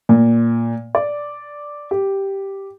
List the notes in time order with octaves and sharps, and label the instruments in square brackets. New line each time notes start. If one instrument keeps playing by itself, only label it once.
[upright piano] A#2
D5
G4